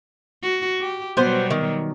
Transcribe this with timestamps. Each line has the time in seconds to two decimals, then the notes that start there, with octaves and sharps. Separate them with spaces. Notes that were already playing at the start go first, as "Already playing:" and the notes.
0.43 F#4
0.81 G4
1.17 B2 F#3 G3 B3 C5
1.51 D#3